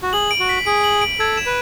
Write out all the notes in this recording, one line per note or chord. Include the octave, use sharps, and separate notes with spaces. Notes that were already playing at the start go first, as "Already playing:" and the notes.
F#4
G#4 F#7
D7
F#4
B6
G#4 D7
F#7
D7
A4 G#6
E7
B4